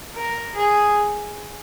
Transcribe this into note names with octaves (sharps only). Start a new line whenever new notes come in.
A#4
G#4